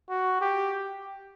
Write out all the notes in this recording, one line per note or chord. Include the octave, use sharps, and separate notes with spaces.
F#4
G4